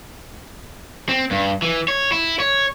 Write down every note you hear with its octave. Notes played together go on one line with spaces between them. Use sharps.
C4
G2
E3
C#5
E4
C#5